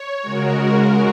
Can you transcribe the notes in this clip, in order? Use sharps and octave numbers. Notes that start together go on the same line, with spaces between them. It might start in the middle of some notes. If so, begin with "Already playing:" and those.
Already playing: C#5
C#3 G#3 F#4 A#4